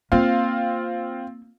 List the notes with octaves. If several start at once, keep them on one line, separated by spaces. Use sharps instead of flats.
A#3 C4 F4 F5